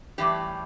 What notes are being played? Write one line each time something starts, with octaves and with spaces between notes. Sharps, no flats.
A2 E3 G3 G4